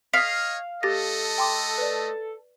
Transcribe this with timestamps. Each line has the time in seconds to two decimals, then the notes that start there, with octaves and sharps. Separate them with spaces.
0.13 C#5 D#5 F5 D#6 B6
0.83 A3 G4 A4 D#5 A6 A#6
1.38 G5 C6 D6
1.78 B4 D5